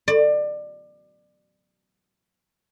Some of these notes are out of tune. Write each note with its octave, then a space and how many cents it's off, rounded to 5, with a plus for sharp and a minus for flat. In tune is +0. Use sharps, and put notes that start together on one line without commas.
D5 +25